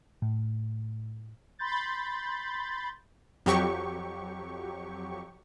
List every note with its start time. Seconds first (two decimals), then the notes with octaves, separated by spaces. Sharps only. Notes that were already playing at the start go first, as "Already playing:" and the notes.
0.22 A2
1.59 B5 C6 G6 A6
3.46 F2 F#3 G4 C#6